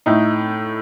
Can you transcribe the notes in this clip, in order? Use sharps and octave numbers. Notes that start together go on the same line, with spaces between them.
A2 A3 D#4